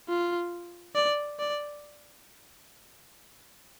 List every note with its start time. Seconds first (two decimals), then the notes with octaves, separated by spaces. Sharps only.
0.09 F4
0.95 D5
1.39 D5